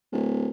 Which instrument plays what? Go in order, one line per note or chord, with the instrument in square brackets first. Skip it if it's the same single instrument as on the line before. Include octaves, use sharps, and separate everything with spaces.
[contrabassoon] D1